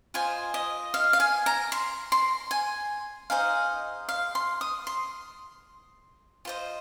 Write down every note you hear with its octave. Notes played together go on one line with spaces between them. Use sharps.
F4 C5 D#5 G#5
D#5
F5
F5
G#5
A#5
C6
C6
G#5
D#4 G#4 C5 D#5 F5
F5
C6
D#6
C6
F4 C5 D#5